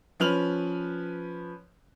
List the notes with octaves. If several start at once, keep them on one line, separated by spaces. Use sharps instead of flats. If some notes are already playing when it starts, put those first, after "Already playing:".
F3 C#4 B4 F6 F7 F#7